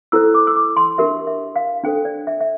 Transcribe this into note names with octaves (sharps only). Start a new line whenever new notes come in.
E4 A4 C5 E6
D6
E6
D6
C6
D4 G4 A#4 E5
E5
F5
D4 A4 C5 G5
D5
E5
E5